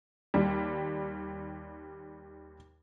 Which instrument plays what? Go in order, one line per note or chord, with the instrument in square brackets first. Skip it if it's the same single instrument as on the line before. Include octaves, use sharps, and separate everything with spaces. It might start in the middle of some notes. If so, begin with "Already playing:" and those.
[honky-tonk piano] D#2 G3